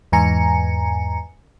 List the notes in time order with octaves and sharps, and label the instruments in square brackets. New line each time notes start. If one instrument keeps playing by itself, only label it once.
[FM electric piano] E2 G#2 G#5 A#5 C#7